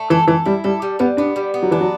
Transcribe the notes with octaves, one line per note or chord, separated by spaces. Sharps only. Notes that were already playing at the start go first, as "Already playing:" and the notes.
Already playing: A3
E3 A4
E3 A4
G3 E4
G3 A4
G3
G3 B3
B3 D4
G3
B3
F#3
E3 D4
F#3